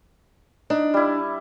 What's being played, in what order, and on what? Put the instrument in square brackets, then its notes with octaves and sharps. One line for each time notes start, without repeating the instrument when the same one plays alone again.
[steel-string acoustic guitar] D4 [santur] D#4
[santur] G3 E4